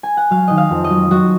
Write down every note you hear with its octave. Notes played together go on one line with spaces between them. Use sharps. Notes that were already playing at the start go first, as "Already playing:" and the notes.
G#5
F#5
F#3 F5
D#3 D#5
F5
F2
D#5
F#3
F#3 F#4